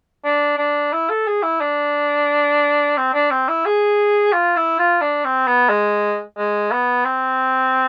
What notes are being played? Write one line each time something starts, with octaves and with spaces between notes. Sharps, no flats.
D4
D4
E4
A4
G#4
E4
D4
C4
D4
C4
E4
G#4
F4
E4
F4
D4
C4
B3
G#3
G#3
B3
C4